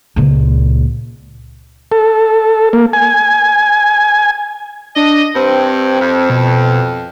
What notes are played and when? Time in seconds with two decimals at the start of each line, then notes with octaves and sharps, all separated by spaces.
0.16 C#2 A#2
1.92 A4
2.73 A#3
2.93 G#5
4.96 D4 D#5
5.36 G2 C4
6.01 F2
6.30 B2